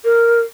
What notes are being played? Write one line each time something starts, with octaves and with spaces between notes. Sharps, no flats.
A#4